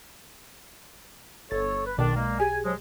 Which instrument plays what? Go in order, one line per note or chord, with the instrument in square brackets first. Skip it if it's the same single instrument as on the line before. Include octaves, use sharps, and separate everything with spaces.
[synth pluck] G1 A6 [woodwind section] A4 C#5
[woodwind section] B4
[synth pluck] B1 B2 D5 [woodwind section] D#3 D4
[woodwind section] G#3 A#3
[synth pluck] G4 G#4 [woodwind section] G#5
[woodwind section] F3 F#3 G#3